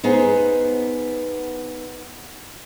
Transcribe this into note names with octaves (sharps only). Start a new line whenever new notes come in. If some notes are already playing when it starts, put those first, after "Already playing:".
B3 D#4 G#4 C5